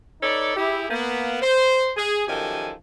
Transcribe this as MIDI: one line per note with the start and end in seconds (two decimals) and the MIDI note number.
0.22 0.55 63
0.22 0.55 69
0.22 0.55 71
0.22 0.55 73
0.22 0.55 74
0.56 0.89 64
0.56 0.89 67
0.56 0.89 68
0.90 1.38 58
0.90 1.38 59
1.42 1.91 72
1.97 2.26 68
2.28 2.72 42
2.28 2.72 51
2.28 2.72 53
2.28 2.72 67
2.28 2.72 69
2.28 2.72 80